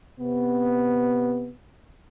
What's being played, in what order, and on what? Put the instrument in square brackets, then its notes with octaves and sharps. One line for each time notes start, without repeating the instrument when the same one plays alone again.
[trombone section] C3 B3